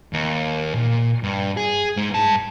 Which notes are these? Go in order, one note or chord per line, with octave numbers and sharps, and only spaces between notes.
D#2
A#2
G2
G#4
G#2 G#3
G2 A5